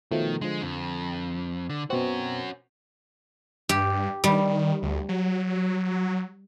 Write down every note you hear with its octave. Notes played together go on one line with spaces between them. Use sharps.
B2 D#3 F3 A3
D3 F3 G#3
F2
D3
B2 C4 C#4 F#4
G2 G4
D#3 G3
D2
F#3